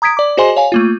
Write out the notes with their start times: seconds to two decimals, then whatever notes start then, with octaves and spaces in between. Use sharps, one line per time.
0.02 A#5 D#6 G#6 B6 D7
0.17 D5 D6
0.37 F#4 G#4 C5 D#5 G#5 C6
0.56 C#5 F5 G#5
0.72 A3 A#3 F4